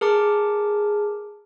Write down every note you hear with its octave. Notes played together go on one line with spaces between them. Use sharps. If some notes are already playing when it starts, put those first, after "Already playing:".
G#4 A#4 A5 D6